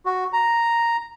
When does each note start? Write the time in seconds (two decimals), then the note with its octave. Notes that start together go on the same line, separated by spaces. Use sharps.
0.06 F#4
0.33 A#5